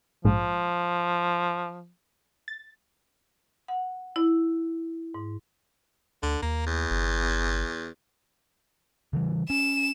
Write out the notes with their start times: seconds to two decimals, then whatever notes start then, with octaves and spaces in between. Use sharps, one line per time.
0.25 A#1 G#2 F3 G#3
2.48 A6
3.68 F#5
4.16 E4
5.14 G#2
6.23 D2 D3
6.42 D#2 A#3
6.66 E2
6.90 G1
9.13 C#3 E3 G3
9.50 C#4 E7